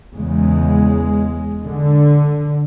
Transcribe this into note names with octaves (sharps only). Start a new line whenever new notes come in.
E2 C#3 G#3
D3